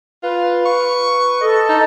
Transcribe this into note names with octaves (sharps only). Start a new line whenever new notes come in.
F4 B4
C#6
A4 D#5
D#4